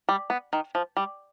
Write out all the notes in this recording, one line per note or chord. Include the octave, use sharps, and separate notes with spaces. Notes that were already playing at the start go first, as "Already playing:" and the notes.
G3
B3
D#3
F3
G3